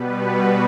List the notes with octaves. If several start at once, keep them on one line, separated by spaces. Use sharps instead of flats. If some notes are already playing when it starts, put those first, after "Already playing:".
Already playing: B2 G3 B3 B4
F#4